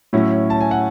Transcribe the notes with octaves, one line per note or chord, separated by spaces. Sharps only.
A2 F#3 C#4 E4
A5
G#5
F#5